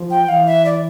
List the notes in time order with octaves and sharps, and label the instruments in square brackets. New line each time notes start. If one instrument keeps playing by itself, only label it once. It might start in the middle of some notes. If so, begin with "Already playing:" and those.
Already playing: [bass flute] F3
[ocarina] G5
[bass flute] E3 [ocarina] F5
[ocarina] E5
D5